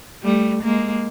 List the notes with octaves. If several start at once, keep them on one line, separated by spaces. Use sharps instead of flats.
G3 A3
G#3 A#3